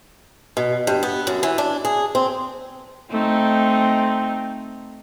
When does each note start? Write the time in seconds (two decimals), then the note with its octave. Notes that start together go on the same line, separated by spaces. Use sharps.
0.57 B2
0.87 G2
1.03 B3
1.27 F#2
1.43 E3
1.58 D4
1.85 G#4
2.15 C4
3.10 A3 C4 D#4